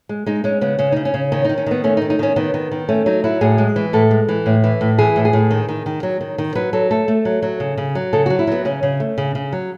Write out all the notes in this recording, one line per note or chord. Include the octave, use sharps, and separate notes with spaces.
G#3
G#3 D#4
G#3 C#4
C#3 B3
C#3 C#4
C#3 D#4
C#4
C#3
D#3 C#4
D#3 D#4
C#4
D#3 B3
A3 C#4
D#4
D#3
D#4
D#3 C#4
D#3 B3
D#3
D#3
A3 C#4
F#3 D#4
F#3 E4
A2 G#4
G#3
E3
A2 A4
G#3
E3
A2
E3
A2
E3 G#4
A2
G#4
A2
D#3
D#3
D#3
F#3
D#3
D#3
F#3 B4
F#3 A4
A3 A4
A3
F#3
F#3
C#3
C#3
F#3
C#3 A4
F#3 F#4
E4
F#3 B3
C#3 C#4
C#3
A3
C#3
C#3
F#3